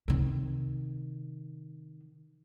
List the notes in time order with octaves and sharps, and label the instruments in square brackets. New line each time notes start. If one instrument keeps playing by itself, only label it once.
[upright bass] C3 D#3